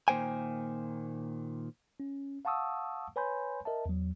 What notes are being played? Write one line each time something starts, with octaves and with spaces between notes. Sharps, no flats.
A#2 D#3 A#3 C5 G5 G#5
C#4
F5 F#5 A5 C#6 D#6 E6
B4 C#5 G#5 B5 C6 G6
A#4 D#5 E5 A5
E2 F#3